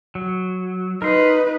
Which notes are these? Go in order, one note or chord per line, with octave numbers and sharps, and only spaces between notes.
F#3
D#4 A#4 B4 C6